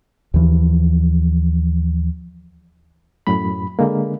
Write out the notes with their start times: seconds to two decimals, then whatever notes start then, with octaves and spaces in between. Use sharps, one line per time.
0.34 D#2 E3 F3
3.27 F#2 A2 B5
3.79 D3 G#3 A#3